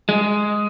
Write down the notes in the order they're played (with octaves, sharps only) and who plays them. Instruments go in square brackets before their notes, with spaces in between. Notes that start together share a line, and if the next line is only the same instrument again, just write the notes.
[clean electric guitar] G#3